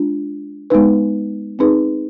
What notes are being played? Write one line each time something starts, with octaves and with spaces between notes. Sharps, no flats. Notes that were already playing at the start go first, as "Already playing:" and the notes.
Already playing: G#3 D4 F4
G#3 B3 D#4 B4
C4 D#4 G#4 B4